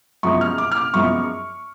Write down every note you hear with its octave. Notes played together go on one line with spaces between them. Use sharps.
F#2 F3 G#3 B3 C#6
F6
D6
F6
D6
F#2 F3 G#3 B3 C#6